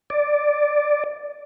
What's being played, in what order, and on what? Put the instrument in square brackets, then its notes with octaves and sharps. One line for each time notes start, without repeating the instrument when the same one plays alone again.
[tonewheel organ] D5